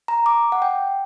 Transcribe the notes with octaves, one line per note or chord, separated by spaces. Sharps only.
A#5
D6
F#5
G5